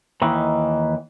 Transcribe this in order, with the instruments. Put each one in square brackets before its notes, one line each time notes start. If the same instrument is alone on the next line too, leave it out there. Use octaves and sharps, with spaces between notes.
[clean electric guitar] D#2 D#3 E3